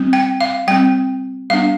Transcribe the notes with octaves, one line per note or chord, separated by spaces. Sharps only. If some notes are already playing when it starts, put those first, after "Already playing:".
Already playing: G3 C4
G5
F5
G3 C4 G5
G3 B3 D4 F5